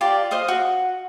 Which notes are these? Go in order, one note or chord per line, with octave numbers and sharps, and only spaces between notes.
F4 G4 D5 A5
C5 D#5 F5 D#6
F#4